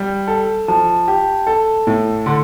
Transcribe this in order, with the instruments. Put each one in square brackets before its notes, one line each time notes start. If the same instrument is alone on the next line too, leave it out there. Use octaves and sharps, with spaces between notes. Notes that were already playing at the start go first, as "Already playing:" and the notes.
Already playing: [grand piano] G3
A4
[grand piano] F3 [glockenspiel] A5
[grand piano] G4
A4
A2
[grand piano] D3 [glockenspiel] C6